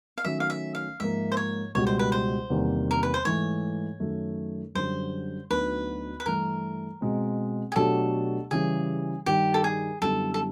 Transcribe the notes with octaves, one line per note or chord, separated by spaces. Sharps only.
F5
D#3 F#3 A3 C#4 E5
F5
E5
F5
G#2 F3 A#3 E5
C5
C#5
C#2 B2 G3 C#5
C5
B4
C5
E2 C3 D#3 G3 A#3
A#4
B4
C5
G#2 E3 A3 C#5
F#2 D#3 F#3 A3
F#2 D3 G3 C5
D2 D3 F#3 B3 D#4 B4
B4
G2 E3 A3 A#4
B2 G#3 C4
G#4
B2 F#3 A3 D4 G4 A4
C#3 E3 G3 G#4
G2 D#3 G3 G4
A4
G#4
F#2 D3 G3 B3 E4 A4
A4